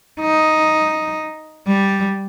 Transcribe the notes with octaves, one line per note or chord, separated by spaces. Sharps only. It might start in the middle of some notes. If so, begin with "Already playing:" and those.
D#4
G3